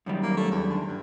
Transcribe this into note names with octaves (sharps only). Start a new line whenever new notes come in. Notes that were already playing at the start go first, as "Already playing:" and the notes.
F#2 D#3 G3
A#3
A3
E2
D3
G2